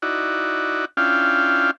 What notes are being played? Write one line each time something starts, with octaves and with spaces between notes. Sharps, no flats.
D#4 E4 F#4 D5
C#4 D4 E4 F4 F5 G5